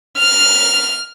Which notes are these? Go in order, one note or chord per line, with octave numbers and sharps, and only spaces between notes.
F6